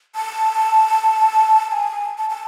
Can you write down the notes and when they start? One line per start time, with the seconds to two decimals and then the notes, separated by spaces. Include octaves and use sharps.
0.15 A5
1.68 A5
1.71 G#5
2.18 A5
2.30 A5